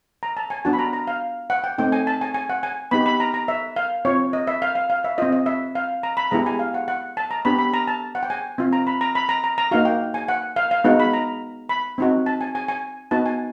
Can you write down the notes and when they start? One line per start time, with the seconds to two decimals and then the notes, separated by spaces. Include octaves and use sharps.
0.23 A#5
0.37 A5
0.50 G#5
0.65 B3 D4 F#4 A5
0.73 B5
0.79 A#5
0.93 A#5
1.07 F5
1.50 F#5
1.64 G5
1.78 A3 C4 D#4 G5
1.92 G#5
2.07 A5
2.21 G#5
2.34 G#5
2.50 F#5
2.63 G#5
2.91 B3 D#4 G4 B5
3.06 B5
3.20 A#5
3.34 A#5
3.48 E5
3.76 F5
4.05 C4 F4 C#5
4.33 D#5
4.47 E5
4.62 F5
4.75 F5
4.90 F5
5.04 E5
5.18 C4 F4 D#5
5.32 D#5
5.46 E5
5.75 F5
6.03 A#5
6.17 B5
6.31 G#3 B3 E4 G4 A#5
6.46 G#5
6.59 F5
6.74 F#5
6.88 F#5
7.17 A5
7.31 A#5
7.45 B3 D4 G4 B5
7.59 B5
7.74 A#5
7.88 A5
8.15 F#5
8.23 G5
8.30 G#5
8.58 C4 F4
8.73 A#5
8.87 B5
9.01 A#5
9.15 B5
9.29 A#5
9.44 A#5
9.58 A#5
9.71 A#3 D#4 F#4 F5
9.85 G5
10.14 G#5
10.28 F#5
10.56 F5
10.71 F5
10.84 G#3 B3 D#4 F#4 F#5
11.00 B5
11.13 A#5
11.69 B5
11.98 C4 D#4 F#4
12.26 A5
12.41 G#5
12.55 G#5
12.68 G#5
13.11 B3 D#4 F#4 A5
13.26 G#5